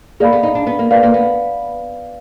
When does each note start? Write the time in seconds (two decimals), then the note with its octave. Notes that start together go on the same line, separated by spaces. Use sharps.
0.20 A#3 G#4 D5 F5 B5
0.33 B3
0.43 D#4
0.55 D4
0.67 B3
0.79 A#3
0.91 A#3 B4 D5 F5
1.03 A#3
1.14 B3